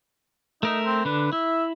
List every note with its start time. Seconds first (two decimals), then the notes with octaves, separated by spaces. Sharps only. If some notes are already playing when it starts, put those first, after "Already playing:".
0.63 A3 D#4 A#4 E5
0.85 C4
1.05 D3 D4 B4
1.33 E4 E5